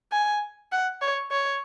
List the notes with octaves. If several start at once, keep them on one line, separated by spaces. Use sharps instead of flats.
G#5
F#5
C#5
C#5